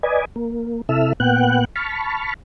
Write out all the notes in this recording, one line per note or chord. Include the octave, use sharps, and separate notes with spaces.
B4 D5 D#5 G#5
A#3
C3 E4 A4 E5 E6 F6
A#2 B3 F#5 G5 F#6
A5 B5 C#6 F6